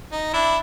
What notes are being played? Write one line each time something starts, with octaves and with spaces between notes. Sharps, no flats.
D#4
D4 E4